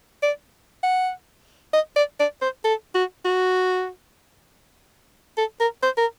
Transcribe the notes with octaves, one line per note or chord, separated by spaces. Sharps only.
D5
F#5
D#5
D5
D5
C5
A4
F#4
F#4
A4
A#4
C5
A#4